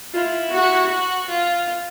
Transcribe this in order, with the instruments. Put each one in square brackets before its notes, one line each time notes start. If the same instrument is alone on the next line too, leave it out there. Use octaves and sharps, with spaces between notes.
[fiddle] E4 [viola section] F4
[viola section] F#4
[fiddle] F#4
F4